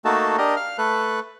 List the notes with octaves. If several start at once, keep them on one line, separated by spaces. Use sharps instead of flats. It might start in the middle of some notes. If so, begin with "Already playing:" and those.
A3 A#3 D#4 F#4 A4 A5
D4 G4 A#4 D#5
F5 F6
A3 A4 B4 F#6